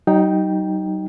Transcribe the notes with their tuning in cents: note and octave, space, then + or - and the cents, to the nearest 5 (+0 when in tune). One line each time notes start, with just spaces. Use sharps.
F#3 +45 D#4 +0 G5 +0